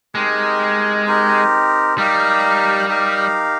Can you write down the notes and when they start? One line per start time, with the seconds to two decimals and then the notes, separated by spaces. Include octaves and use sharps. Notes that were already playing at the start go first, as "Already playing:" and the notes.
0.15 G#3 C4 D#4 G4 A#4
1.06 C4 D#4 G4 A#4
1.97 G3 D#4 G4 A#4 F5
2.89 D#4 G4 A#4 F5